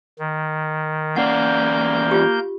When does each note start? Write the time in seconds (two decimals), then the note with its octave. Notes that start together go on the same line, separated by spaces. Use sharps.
0.19 D#3
1.16 E2 A#3 C#4 D5 F#5 G6
2.11 F4 G4